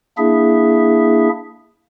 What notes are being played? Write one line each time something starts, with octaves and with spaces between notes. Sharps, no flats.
A#3 D4 E4 G#4 E5